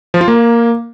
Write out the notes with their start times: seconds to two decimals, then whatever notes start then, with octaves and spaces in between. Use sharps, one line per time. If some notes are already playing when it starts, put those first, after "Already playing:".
0.14 F3
0.21 F4
0.28 A#3